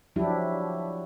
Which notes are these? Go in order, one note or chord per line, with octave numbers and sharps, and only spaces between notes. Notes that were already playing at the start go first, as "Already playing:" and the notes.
F3 F#3 D4 E4 G4